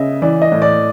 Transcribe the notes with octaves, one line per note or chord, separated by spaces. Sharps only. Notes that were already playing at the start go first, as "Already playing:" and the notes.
Already playing: C#3 D#5 E5
E3 D5
D#5
A2
D5